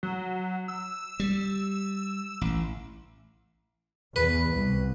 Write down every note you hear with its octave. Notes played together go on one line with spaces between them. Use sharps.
F#3
E6
G3
A1
E2 B4
C2